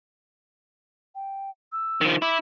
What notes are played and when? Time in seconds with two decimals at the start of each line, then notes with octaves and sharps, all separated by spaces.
1.15 G5
1.72 E6
2.01 D#3 F3
2.22 E4 D6